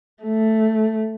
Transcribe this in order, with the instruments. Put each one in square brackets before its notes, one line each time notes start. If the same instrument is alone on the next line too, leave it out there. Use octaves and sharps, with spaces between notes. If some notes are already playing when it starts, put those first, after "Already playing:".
[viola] A3